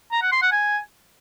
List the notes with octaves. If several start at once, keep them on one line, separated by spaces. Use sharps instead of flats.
A#5
F#5
C6
F#5
G#5